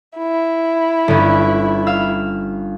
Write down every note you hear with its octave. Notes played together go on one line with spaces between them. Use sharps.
E4
G1 C#4
F5 E6